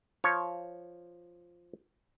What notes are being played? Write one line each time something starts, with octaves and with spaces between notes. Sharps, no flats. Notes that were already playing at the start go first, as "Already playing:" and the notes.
F3 C#5